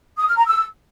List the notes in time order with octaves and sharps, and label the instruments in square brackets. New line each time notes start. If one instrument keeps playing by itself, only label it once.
[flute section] D#6
F6
A#5
E6